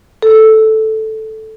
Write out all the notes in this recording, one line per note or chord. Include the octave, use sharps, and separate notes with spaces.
A4